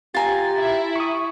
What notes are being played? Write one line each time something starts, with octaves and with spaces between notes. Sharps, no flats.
F4 G4 G#5 A#5 A6
E4
C#6 D#6